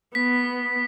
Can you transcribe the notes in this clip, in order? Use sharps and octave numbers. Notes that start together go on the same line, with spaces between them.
B3 B6